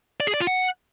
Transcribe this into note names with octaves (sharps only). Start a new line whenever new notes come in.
D5
G#4
D5
F4
F#5